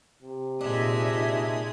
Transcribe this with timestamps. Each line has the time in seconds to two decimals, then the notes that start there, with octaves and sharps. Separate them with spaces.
0.22 C3
0.61 A#2 G#3 D4 D#4 E5 D#6